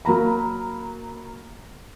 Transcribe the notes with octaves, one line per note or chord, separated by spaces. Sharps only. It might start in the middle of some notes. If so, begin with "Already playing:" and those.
F#3 A#3 A#5 B5